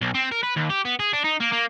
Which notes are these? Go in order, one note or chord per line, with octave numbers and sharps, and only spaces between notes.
B1
C4
A#4
B4
D#2
G4
B3
G#4
D4
D#4
A#3
A#3